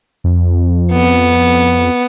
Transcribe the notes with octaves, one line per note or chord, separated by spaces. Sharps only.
F2
B3